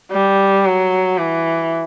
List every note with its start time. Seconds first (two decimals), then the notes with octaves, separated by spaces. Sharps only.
0.12 G3
0.66 F#3
1.18 E3